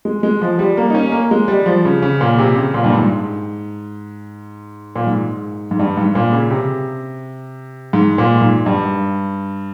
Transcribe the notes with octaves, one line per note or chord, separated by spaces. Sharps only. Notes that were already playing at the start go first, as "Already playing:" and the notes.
G#3
G#3
F3
G3
A#3
D#4
C#4
A#3
G#3
G3
F3
C#3
C#3
A#2
C3
C#3
A#2
G2
G#2
A#2
G#2
G#2
G2
G#2
A#2
C#3
C3
G#2
A#2
G#2
G2